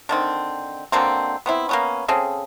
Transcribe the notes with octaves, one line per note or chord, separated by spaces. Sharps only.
D3 D#3 C4
B2 D3 A#3 C4
B3 C4 E4
A#3 B3 C#4
C#3 C4 G#4 A4